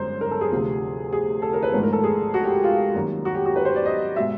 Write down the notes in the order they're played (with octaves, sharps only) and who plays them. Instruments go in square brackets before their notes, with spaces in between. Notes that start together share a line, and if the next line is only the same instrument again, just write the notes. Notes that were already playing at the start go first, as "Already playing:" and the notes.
Already playing: [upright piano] G1 F#2 G#3 C5
A#4
A4
G#4
D2 C3 F3
G#4
A4
A#4
B4
G#1 G#2 F3 A3 B4
A#4
A4
G#4
F#4
G4
F4
F#2 D#3 G3 A#3
F#4
G4
F#4
B4
C5
D5
D#5
B2 G#3 E5